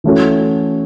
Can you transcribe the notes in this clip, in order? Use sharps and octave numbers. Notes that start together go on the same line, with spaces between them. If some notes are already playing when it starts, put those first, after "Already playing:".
E3 A3 C#4 F#4 A4